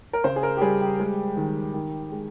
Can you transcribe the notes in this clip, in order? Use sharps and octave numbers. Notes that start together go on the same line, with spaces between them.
A#4
C#3 C5
G#4
A#4
G4
G3 G#4
G4
G#3
D#3
D#3
G#3